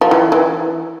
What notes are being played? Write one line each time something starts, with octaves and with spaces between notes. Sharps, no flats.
F3
E3
E3